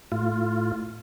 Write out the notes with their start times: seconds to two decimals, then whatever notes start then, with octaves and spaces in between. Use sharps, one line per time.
0.12 A2 F4